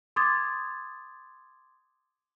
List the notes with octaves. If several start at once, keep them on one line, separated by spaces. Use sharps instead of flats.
C6 D6 D#6 G#6 A6